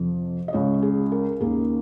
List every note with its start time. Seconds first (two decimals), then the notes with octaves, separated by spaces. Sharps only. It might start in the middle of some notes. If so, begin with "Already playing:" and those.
Already playing: F2 C3 F3
0.48 D#5
0.53 C#2 C#3 G#3 C#5
0.82 G#4
1.12 A#4
1.40 D#2 D#3 A#3 C#4 G#4